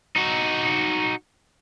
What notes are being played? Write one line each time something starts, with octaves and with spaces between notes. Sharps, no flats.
D#4 F#4